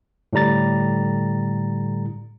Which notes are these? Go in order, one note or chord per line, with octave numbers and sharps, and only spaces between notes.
A2 D3 G3 A#5 A6